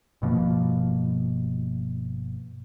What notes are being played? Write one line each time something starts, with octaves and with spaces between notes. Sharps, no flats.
G1 B2 F3 A#3